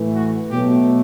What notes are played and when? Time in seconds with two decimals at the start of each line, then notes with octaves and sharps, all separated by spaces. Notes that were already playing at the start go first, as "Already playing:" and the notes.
Already playing: A2 E3 A3
0.13 F#4
0.51 B2 F#3 A3 G4